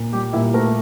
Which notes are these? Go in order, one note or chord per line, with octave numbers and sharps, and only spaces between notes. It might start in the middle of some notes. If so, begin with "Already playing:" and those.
Already playing: A#2
G3 G4
A#2 E4
A3 A#4